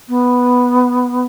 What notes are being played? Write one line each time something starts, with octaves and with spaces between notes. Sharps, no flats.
B3